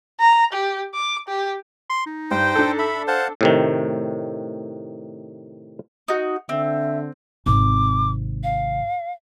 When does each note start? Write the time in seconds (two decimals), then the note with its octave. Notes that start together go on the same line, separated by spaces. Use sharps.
0.20 A#5
0.53 G4
0.95 D6
1.28 G4
1.90 C6
2.06 D#4
2.31 G2 C5 G5
2.56 D4 A4
2.79 E5 B5
3.08 C5 F5 F#5 A5
3.41 A2 C3 D#3
6.08 D#4 F#4
6.49 D3 C4 E5
7.46 G#1 C3 D6
8.43 F5